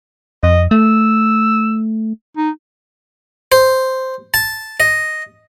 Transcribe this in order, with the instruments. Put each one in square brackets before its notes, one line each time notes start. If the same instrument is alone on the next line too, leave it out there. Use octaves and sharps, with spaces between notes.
[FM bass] F2 [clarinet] D#5
[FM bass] A3 [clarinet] E6
[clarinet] D#4
[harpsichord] C5
A5
D#5